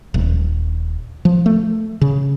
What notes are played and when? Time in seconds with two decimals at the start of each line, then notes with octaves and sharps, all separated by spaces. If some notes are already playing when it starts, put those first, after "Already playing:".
0.14 D#1
1.25 F3
1.46 A3
2.01 C#3